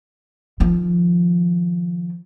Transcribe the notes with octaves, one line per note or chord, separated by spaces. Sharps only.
D#3 F3